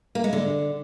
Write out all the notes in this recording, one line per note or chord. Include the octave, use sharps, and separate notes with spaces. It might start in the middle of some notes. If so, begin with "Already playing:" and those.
A#3
G#3
D3